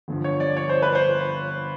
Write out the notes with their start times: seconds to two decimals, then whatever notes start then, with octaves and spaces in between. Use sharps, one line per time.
0.08 G1 G2 D3 F3
0.24 C#5
0.40 D5
0.57 C#5
0.69 C5
0.82 B4
0.95 C5